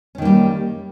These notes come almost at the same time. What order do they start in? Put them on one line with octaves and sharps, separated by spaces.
C#4 D#3 A#3 G3